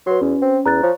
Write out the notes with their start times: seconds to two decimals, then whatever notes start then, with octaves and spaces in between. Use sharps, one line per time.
0.06 F#3 F#4 B4 C6
0.22 E2 C#4
0.42 C4
0.66 E2 A#5 F#6 A6
0.83 F3 C#5